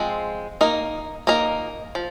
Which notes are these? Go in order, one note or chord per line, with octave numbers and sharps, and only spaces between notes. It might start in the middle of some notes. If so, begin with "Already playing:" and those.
Already playing: F3 G#3 C4
A#3 D#4 A#4 D#5
A#3 D#4 A#4 D#5
F3